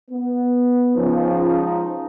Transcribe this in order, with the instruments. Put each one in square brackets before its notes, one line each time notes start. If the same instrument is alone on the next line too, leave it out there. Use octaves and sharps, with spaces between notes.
[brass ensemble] B3
[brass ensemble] C#2 C#3 [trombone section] F3 D#4